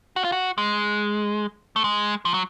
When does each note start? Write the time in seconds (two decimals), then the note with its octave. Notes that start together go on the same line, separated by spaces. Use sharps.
0.16 F#4
0.24 F4
0.32 F#4
0.58 G#3
1.76 A3
1.84 G#3
2.25 F3
2.34 F#3